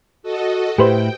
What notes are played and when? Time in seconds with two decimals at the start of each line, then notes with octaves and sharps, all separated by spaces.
0.23 F#4 A4 D#5
0.78 A2 E4 G4 B4 C5 G5